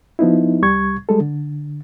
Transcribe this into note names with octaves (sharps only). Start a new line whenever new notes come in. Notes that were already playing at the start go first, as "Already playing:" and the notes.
F3 B3 D#4 E4
C2 G3 C#6 G#6
G3 G#3 A4
D3